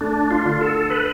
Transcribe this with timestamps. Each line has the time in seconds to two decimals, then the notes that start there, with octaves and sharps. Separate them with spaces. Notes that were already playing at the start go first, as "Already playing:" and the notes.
0.01 A3 D4
0.31 F4
0.45 D3
0.61 A4
0.90 B4